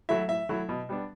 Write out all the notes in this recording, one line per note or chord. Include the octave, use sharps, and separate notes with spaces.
F#3 A3 E4 E5
A2 E5
F#3 A3 E4
B2
G3 B3 D4